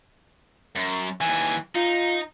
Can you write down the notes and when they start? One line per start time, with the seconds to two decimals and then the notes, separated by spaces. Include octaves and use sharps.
0.76 F#2
1.21 D#2 E3 G#5
1.75 D#4 F4